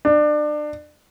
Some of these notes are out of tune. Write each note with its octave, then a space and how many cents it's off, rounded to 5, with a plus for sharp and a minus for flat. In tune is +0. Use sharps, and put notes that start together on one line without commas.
D4 +30